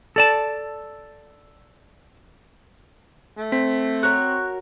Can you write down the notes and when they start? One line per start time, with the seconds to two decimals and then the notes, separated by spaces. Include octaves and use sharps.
0.16 A4 D5 A5
3.37 A3
3.52 C4 B6
4.03 F#4 A#4 C#5 F#6